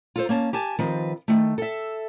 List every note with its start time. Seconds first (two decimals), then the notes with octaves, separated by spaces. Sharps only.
0.16 F4 A4 C5
0.29 A#3 C#4 A5
0.53 G4 G#5 A5
0.79 D#3 F3 C4 B4
1.28 D#3 A3
1.58 A4 E5